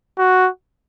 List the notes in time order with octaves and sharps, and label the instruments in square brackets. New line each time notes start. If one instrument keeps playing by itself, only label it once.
[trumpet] F#4